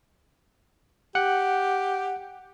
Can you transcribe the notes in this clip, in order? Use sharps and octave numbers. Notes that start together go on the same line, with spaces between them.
G4 F#5